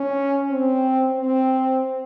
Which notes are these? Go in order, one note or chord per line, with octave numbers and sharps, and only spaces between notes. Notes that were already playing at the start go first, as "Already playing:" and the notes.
Already playing: C#4
C4
C4